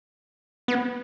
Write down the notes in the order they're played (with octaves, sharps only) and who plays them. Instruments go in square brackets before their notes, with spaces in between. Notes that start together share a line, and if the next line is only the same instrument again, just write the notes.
[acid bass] B3